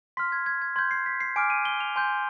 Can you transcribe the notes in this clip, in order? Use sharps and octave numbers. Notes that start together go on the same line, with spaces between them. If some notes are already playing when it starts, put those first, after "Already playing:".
C6 F6 B6
G#6
G#6
G#6
C6 G6 G#6
C7
B6
C7
G#5 D6 F6 D7
D#7
G7
F7
G#5 C6 G6